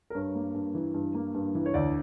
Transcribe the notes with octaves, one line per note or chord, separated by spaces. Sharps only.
A#4
G2 C#5
A#3
G2
E3
G2
A#3
G2
E3
C#5
D2 D5